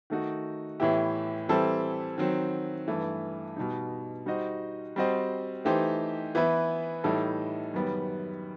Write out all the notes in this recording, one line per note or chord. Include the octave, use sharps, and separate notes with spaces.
D#3 A3 D#4 F#4
A2 E3 B3 E4 G4
E3 G3 C4 E4 A4
D#3 F#3 C4
G2 E3 A3
B2 G3 D#4
G3 D#4 F#4 C5 D#5
G3 C4 F#4 C5 D#5
E3 A3 D#4 G4 C5
E3 B3 E4 B4
A2 E3 G3 D#4 A4
F#2 D#3 G3 B3